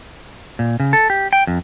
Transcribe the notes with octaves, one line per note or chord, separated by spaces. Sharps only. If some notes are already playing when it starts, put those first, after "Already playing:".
A#2
C#3
A4
G4
G5
F2